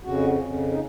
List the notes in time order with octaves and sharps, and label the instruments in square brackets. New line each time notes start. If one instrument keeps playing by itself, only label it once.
[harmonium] F2 C#3 F#4
F2 C#3
D#4